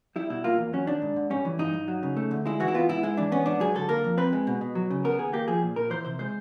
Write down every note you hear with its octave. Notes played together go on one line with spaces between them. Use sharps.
G3 E4
B2 E4
A#3 F4
E2
F#3 C#4
D#3 D4
G#2
G#2
G3 C#4
E3
G2 D#4
G2
F#3
C#3
A3
D2
G#3 E4
E3 F#4
E4
B3 F4
G#2 E4
G#3 E4
E3 D4
B3 C#4
G#2 D4
F#3 G#4
D3 A4
A#3 A#4
F2
C4 B4
G#3
B2
B2
F#3
C#3
B3 A#4
D#2 G#4
A#3 G4
F3 G#4
A#2
A#2 A#4
E3 C5
C3 C5
G#3 C5